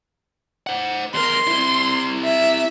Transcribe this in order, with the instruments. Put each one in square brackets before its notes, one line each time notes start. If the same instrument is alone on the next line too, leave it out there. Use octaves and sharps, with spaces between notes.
[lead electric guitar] C5 F#5
[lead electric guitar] E2 A#4 [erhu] C6
[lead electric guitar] C4 E4
[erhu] E5